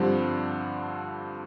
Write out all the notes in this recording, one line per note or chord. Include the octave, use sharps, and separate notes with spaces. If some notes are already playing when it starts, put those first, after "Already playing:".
Already playing: G2 D3 F3 G3 C4